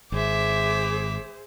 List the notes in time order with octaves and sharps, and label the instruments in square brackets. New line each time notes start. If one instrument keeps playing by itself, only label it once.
[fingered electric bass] G#1 [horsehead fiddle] G#4 C5 [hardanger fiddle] E5 D6